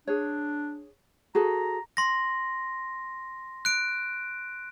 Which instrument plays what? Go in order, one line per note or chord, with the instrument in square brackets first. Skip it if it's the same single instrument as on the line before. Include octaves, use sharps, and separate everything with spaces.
[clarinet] D4 [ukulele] G#4 C#5
[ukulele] F#4 G#4 A4 [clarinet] A#5
[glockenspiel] C6 A#6
F#6 D7